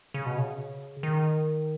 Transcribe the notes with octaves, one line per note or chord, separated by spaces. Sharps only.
C#3
B2
C#3
D#3